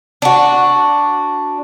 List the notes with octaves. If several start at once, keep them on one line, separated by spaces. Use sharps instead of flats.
D4 F#4